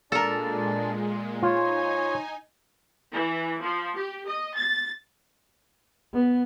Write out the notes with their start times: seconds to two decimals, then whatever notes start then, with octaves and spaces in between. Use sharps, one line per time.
0.12 A#2 G#3 D4 A4 A#4 D5
1.43 D#4 F4 C5 C#5 G#5
3.13 E3
3.63 F3
3.96 G4
4.27 D#5
4.57 A6
6.14 B3